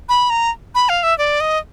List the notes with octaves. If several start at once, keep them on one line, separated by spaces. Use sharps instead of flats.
B5
A#5
B5
F5
E5
D5
D#5